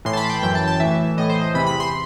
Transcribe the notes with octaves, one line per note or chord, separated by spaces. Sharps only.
A2 E3 C6
A5
B5
G5
F#2 E3 G5
A5
A5
A2 E3 E5
A2 E3 D#5
C5
D#5
E2 C3 E3 B5
B5
C6